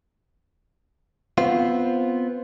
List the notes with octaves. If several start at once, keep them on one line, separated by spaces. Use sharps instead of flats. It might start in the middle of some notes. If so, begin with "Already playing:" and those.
B3 C4 F4